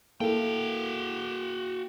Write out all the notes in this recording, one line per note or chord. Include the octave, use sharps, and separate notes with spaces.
A#3 E4 F#4 A4 F5 G5